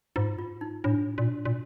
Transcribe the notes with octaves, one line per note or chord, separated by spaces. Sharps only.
G#2 F4
F4
D#4
A2 D4
A#2
A#2